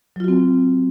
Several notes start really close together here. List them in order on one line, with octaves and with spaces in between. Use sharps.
F#3 F4 F#4 C4